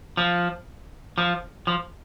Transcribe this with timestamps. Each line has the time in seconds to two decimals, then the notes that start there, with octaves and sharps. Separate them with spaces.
0.17 F3
1.18 F3
1.67 F3